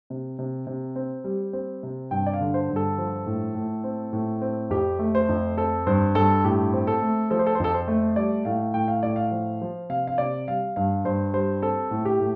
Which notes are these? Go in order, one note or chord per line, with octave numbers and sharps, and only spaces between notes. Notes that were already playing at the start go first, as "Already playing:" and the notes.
C3
C3
C3
C4
G3
C4
C3
G2 G5
D5
F5
D3
C5
G2
A4
F3
A2
A2
C4
A2
C4
F2 G4
A3
C5
F2
C4 A4
G2 C5
G2 A4
A2 G4
C4
A4
A3
F3 A4
C5
A4
C5
F2 A4
C5
A3
G3 D5
A2 F5
A2 G5
F5
A2 D5
F5
F3
F3
C3 F5
F5
C3 D5
G3 F5
G2 F5
G2 C5
G3 C5
C4 A4
A2
G4
A2